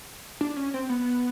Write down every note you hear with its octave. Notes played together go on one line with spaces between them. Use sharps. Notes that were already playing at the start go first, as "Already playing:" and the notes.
D4
C#4
C4
B3